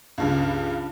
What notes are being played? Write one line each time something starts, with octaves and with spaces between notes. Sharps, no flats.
C#2 G2 C#3